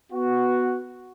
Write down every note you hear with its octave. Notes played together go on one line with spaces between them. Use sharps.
B3 F#4